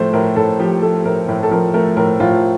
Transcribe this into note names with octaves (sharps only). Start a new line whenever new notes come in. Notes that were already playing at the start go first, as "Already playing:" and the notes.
Already playing: A2 F3 A3 C5
A2 A#4
A2 A4
F3 G4
A3 A4
A2 A#4
A2
A4
F3 A#4
A3 A#4
A2 A#4
A2 F4